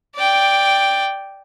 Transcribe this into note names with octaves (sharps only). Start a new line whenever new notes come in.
D5 G5